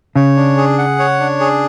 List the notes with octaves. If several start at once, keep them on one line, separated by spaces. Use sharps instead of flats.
C#3 C#5
D4
G#4
F#5
C#5
D4
G#4